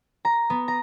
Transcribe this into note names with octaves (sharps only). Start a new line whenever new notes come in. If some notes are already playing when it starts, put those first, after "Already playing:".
A#5
B3
A#5